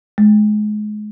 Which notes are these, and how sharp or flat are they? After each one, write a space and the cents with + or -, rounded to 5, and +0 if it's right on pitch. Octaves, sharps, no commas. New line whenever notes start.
G#3 +30